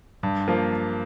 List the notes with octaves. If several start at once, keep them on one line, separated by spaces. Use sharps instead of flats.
G2
F3 A#3